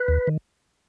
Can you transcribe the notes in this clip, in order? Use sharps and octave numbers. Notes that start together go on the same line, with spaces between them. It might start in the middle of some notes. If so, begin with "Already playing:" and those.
Already playing: B4
D#2
D#3